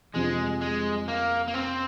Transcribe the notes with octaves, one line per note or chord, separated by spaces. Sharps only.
F2 C3 F3 G#3
G#3
A#3
A#3
C4